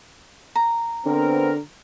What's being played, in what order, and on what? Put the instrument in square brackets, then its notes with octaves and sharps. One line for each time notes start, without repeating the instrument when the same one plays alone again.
[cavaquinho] A#5
[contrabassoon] D3 [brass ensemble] B3 C4 A#4